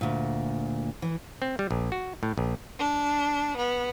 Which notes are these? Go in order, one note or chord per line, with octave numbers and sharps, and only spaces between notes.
D2 A#2
E3
C4
G3
A#1
F#4
A2
A#1
D4
B3